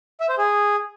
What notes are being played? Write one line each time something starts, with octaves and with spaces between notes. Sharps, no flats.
E5
C5
G#4